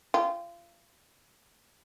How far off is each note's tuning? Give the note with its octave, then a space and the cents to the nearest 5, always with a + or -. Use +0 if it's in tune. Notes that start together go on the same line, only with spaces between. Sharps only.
F4 -30 G5 -20